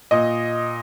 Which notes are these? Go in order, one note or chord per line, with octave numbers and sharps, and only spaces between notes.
A#2 D#5